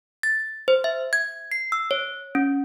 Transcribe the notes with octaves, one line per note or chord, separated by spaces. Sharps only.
A6
C5
E5
G#6
C7
E6
C#5
C#4